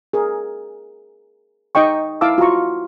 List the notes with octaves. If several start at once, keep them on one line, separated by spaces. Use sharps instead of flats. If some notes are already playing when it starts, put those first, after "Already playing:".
G#4 A#4
D#4 D#5 G5 C#6
E4 F5 A5 D6 E6
F4 F#4 A#5 C#6